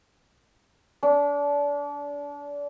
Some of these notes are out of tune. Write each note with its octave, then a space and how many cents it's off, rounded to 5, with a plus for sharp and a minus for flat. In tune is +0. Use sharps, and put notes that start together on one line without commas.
D4 -30